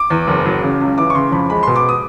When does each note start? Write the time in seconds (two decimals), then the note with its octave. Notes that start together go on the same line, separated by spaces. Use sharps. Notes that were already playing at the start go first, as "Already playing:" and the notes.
Already playing: D6
0.10 E2
0.27 F#1
0.46 F#3
0.62 C#3
0.80 C#2
0.97 E3 D6
1.10 C#6
1.15 C#3 C6
1.32 F2 B5
1.50 G#3 B5
1.63 B2 C6
1.76 D6
1.89 D#6